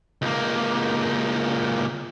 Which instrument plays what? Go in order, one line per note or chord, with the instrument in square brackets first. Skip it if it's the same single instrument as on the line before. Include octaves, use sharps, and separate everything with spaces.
[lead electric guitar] C#2 A#3